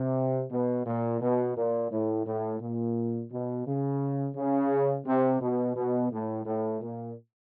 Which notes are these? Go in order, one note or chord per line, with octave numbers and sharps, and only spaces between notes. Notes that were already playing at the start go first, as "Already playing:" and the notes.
Already playing: C3
B2
A#2
B2
A#2
A2
A2
A#2
B2
C#3
C#3
C3
B2
B2
A2
A2
A#2